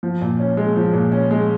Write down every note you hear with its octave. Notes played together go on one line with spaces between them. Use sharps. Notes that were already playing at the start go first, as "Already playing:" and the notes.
F3
A#2
C#4
G#3
F3
A#2
C#4
G#3